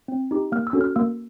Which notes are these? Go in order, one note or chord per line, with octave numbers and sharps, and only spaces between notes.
C4
D#4 G4
A#3 F6
E6
C#4 F#4 A4
F6
A#3 E6